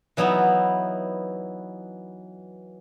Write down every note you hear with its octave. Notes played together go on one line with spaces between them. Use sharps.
E3 F#3 B3 D#4 E4